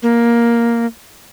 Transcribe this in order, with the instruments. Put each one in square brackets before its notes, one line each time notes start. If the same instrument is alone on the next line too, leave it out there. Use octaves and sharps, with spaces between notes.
[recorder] A#3